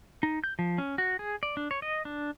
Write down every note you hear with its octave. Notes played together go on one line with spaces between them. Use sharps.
D#4
G6
F3
C#4
F#4
G#4
D5
D4
C#5
D#5
D4